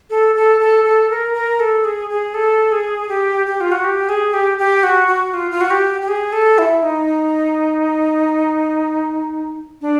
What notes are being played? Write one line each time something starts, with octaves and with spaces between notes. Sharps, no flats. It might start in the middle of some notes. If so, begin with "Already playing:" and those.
A4
A4
A4
A4
A#4
A#4
A4
G#4
G#4
A4
G#4
G4
G4
F4
F#4
G4
G#4
G4
G4
F#4
F#4
F4
F4
F#4
G4
G4
G#4
A4
E4
D#4
D4